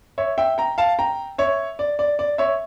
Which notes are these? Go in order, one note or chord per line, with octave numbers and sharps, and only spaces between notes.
C#5 E5
E5 G5
G5 A#5
F5 A5
G5 A#5
C#5 E5
D5
D5
D5
C#5 E5